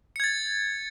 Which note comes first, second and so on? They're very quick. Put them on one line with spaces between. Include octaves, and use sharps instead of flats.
C#7 G#6 A6